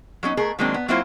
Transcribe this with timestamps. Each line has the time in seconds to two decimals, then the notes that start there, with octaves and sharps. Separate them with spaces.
0.23 F#3 G3 C#4 D#4
0.37 A3 G#4 A#4
0.59 D#3 F#3 G#3 A#3 C4 D4
0.74 B3
0.88 F#3 A#3 C4 E4 F4 C5